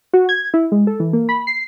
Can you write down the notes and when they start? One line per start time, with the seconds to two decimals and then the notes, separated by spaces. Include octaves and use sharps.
0.13 F#4
0.29 G#6
0.54 E4
0.72 G#3
0.87 A4
1.00 E3
1.13 A#3
1.29 B5
1.47 C7